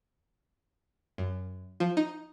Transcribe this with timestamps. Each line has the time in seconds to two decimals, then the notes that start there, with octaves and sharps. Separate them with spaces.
1.18 F#2
1.80 F3
1.97 D#4